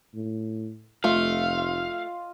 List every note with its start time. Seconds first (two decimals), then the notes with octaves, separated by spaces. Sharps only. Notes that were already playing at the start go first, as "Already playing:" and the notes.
0.15 A2
1.04 F1 A3 F4 D#5 F5